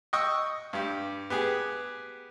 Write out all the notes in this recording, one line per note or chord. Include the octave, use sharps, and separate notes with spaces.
D#5 G5 C#6 D#6 E6
G2 G4
B3 G4 G#4